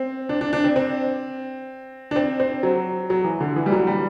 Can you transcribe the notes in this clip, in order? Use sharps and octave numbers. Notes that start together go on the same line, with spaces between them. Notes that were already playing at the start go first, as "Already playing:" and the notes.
Already playing: C4
D4
D4
D4
C4
C4
D4
C4
C4
F#3
F#3
E3
D3
E3
G3
F#3
G3